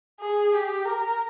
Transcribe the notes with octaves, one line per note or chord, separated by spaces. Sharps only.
G#4
G4
A#4